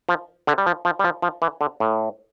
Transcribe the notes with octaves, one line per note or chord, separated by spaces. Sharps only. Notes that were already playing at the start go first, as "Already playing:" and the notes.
F3
D3
G3
F3
F3
G3
F3
F3
E3
D3
A2